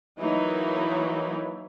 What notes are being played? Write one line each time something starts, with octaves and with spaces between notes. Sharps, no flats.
E3 F#3 A#3 D#4